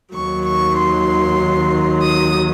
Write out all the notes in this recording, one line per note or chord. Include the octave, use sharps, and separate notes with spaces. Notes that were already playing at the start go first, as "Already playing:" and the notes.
D#2 D#3 F#3 C#6
C#6
C6
D#6